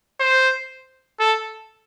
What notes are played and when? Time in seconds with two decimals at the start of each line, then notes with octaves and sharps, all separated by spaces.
0.20 C5
1.20 A4